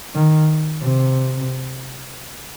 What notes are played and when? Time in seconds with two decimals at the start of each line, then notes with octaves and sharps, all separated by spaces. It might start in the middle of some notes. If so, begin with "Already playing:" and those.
0.15 D#3
0.82 C3